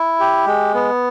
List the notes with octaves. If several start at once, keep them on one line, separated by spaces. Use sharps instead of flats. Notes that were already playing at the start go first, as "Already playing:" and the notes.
Already playing: E4
G4
G#3
B3